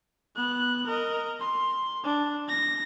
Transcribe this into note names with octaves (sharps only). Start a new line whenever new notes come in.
B3 F#6
A#4 D#5
C6
D4
A#6